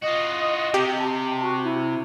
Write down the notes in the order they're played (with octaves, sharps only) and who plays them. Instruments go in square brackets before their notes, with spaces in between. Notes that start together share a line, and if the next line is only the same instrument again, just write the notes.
[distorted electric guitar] F4 F#4 [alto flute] D#5
[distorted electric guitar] C3 [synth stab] G4
[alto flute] A5
F#4
E4